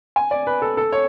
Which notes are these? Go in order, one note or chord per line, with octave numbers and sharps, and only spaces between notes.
G#5
D5
B4
A4
A4
C#5